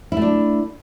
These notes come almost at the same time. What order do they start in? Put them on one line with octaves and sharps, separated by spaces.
E4 A3 D4